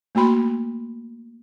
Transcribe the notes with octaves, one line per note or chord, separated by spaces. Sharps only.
A3 A#3 F#4 B5 C6